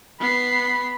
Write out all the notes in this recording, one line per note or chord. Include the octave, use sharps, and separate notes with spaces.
B3 B5 C7